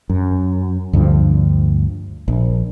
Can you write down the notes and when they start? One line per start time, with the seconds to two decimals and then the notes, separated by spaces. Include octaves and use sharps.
0.10 F#2
0.93 D2 G2 D3 F3
2.28 A#1